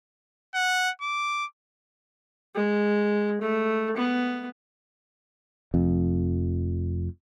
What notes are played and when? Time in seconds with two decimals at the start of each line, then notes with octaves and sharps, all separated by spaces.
0.55 F#5
1.01 D6
2.55 G#3
3.41 A3
3.97 B3
5.74 F1 F2